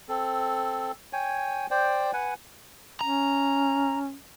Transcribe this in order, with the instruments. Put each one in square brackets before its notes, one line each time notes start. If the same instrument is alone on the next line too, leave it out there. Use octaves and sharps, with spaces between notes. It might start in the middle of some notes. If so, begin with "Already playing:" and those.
[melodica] C4 A4
C#5 G5 G#5
C5 D5 G5
B4 F#5 G#5
[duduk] C#4 [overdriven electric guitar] A#5